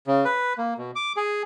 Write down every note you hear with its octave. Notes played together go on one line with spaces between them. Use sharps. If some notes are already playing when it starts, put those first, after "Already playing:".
C#3
B4
A#3
B2
D6
G#4